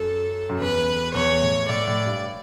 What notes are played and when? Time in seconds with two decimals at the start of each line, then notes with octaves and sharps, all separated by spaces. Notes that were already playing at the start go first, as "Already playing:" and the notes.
Already playing: F#2 A4
0.49 F#2
0.59 E2 B4
1.14 E2 C#5
1.42 A2
1.69 A2 D5
1.87 A2
2.06 G2